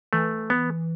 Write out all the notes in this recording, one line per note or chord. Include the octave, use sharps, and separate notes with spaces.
E3 A3
B3